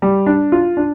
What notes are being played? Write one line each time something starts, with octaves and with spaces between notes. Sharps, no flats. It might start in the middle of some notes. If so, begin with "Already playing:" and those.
G3
D4
F4
D4